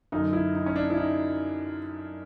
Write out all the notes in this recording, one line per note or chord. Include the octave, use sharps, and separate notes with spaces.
F#2 D3 D#4
E4
D#4
C#4
D4
E4
D#4